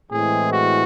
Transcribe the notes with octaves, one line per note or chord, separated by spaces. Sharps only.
A2 E3 G#3 C4 G#4
F#4